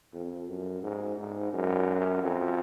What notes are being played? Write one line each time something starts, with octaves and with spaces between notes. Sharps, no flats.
F2
F#2
G#2
G#2
F#2
F2